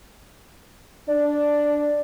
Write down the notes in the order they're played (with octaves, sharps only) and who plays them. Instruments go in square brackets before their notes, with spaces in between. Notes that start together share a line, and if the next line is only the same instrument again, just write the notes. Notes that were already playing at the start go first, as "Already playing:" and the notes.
[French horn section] D4 [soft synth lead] D5